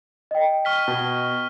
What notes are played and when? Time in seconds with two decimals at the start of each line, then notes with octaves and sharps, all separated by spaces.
0.31 D#5 G5
0.65 C#6 F6 B6
0.88 B2